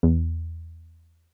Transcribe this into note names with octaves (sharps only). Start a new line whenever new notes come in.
E2